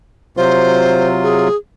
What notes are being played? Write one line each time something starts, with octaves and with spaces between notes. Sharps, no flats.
C3 F#3 F4 C5
G#4